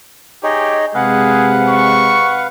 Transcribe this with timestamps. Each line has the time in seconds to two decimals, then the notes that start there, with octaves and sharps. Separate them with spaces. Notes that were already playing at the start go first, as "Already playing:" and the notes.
0.43 D#4 G4 G#4 C#5 D#5
0.95 C3 G#3 G#4 B4 F5 F#5
1.69 C#6